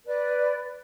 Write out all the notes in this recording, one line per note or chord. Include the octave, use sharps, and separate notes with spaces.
B4 D5